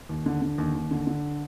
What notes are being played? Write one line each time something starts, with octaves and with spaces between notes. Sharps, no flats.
D#2
D3
D3
D#2
D#2
D3
D3